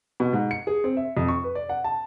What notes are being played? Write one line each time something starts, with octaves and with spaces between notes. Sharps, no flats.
B2
G#2
C#7
G#4
C4
E5
F2
C#6
B4
D5
F#5
A5